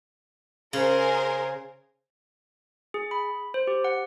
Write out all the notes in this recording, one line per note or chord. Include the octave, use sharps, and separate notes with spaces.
C#3 G#4 A#4 C5
G#4
B5
C5
G4
F#5